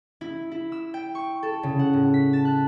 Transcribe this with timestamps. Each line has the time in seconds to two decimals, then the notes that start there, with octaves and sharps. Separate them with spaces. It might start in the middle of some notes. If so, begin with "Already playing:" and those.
0.21 E4
0.51 E4
0.72 E6
0.94 G5
1.15 C#6
1.43 A4
1.63 C#3
1.79 F#5
1.93 A2
2.14 B6
2.33 A5
2.45 F#6